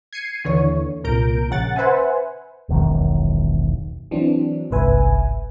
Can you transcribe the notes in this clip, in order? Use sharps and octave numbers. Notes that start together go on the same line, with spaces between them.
G#6 C7 C#7 D#7
D#2 D3 E3 C#5
C2 A#2 A#4 A#5 G6 D7
A#1 C#3 F#5 A6
B4 C5 E5 F#5 G#5
E1 B1 F#2 D#3
E3 F#3 C4 D4
G1 C2 G#2 B4 E5 G#5